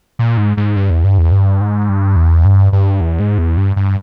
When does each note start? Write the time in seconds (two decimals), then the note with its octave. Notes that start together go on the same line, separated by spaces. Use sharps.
0.19 A#2
0.37 G#2
0.57 G#2
0.76 G2
0.90 E2
1.04 G2
1.18 E2
1.32 G2
1.61 G#2
1.89 G2
2.16 E2
2.45 G2
2.73 G2
3.01 E2
3.20 G#2
3.38 E2
3.57 G2
3.76 G2